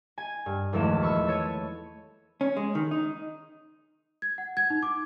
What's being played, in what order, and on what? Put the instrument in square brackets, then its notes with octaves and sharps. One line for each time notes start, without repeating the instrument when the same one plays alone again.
[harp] G#5
G2
D#1 E2 F3 G#3 A3 E7
B5 C#6 E6
A4 C#5 D#7
[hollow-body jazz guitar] C#4
G#3
D#3
D#4
[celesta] G#6
F#5
G#6
D#4
D6